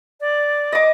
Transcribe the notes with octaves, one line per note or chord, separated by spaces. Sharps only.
D5
D#5 D6